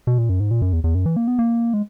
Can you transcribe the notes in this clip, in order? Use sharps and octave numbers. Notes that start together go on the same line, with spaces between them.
B2
A#2
F#2
G#2
A#2
F#2
E2
E2
F#2
E3
A#3
B3
A#3
G#3